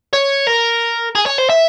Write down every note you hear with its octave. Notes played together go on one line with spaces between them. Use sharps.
C#5
A#4
G#4
C#5
C5
E5